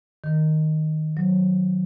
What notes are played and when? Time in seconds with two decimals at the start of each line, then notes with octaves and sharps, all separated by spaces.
0.24 D#3
1.17 F#3